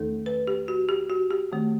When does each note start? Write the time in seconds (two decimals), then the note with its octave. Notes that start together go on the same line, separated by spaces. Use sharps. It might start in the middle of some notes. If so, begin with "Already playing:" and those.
Already playing: E2 D#3 A3 D#4 A4
0.26 B4
0.47 G4
0.68 F#4
0.89 G4
1.10 F#4
1.31 G4
1.52 D#3 A3 C4